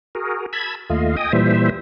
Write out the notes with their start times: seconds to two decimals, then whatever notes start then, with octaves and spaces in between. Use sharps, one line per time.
0.15 F#4 G#4 A#4
0.53 A5 B5 E6 G#6
0.90 D#2 A3 F4 D#5 F5
1.17 D#5 G5 G#5 D#6
1.33 A#2 E3 G3 C5 E5